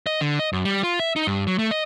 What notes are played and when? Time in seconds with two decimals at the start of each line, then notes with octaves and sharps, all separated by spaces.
0.07 D#5
0.21 D3
0.39 D#5
0.53 F#2
0.65 G3
0.83 F4
1.00 E5
1.16 D#4
1.27 G2
1.47 F#3
1.59 A3
1.71 D#5